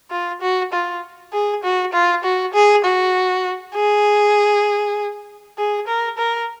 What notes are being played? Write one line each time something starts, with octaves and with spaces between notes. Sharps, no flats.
F4
F#4
F4
G#4
F#4
F4
F#4
G#4
F#4
G#4
G#4
A#4
A#4